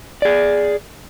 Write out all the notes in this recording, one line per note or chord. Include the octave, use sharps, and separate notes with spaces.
G#4 D5